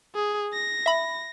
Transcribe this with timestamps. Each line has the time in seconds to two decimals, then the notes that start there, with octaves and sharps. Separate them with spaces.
0.15 G#4
0.53 A#6
0.86 E5 B5